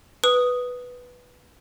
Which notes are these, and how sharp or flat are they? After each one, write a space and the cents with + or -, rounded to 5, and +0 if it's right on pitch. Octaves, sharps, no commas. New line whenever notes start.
B4 +0 D#6 +0